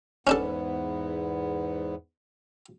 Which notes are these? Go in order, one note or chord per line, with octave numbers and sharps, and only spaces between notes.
E2 G#2 B3 C#4 D4 A4